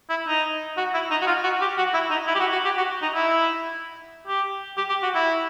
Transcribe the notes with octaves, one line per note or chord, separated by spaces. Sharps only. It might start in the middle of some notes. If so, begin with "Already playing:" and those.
E4
D#4
F#4
E4
D#4
F#4
F4
F#4
G4
F#4
E4
D#4
E4
G4
F#4
F#4
G4
F#4
D#4
E4
G4
G4
G4
F#4
E4